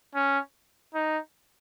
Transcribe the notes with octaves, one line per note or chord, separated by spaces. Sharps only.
C#4
D#4